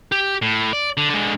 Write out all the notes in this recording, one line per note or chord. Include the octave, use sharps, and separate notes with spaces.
G4
A2
D5
D3
D3 G#3